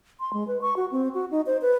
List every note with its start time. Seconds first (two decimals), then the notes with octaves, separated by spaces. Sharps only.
0.20 C6
0.33 G#3
0.47 B4
0.61 C#6
0.76 F#4
0.91 C4
1.14 F#4
1.31 D#4
1.47 C5
1.62 B4